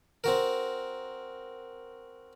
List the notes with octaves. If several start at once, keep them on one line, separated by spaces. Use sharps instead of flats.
C4 F#4 A#4